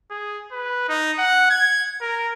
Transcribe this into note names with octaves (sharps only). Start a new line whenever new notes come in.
G#4
B4
D#4
F#5
G#6
A#4